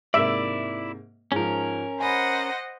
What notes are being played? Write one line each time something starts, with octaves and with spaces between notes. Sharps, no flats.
G#2 C3 A#3 E4 D5 E5
G#2 F3 C#4 A#4
C5 D#5 F#5 G#5 B5